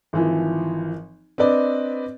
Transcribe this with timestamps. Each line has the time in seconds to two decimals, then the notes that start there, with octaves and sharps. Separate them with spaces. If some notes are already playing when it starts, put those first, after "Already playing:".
0.13 G#1 E3 F3
1.38 C4 D4 B4 D5 D#5